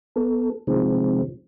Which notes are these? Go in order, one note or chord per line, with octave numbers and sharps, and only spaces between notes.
B3 A4
C3 D#3 F3 G#3 C4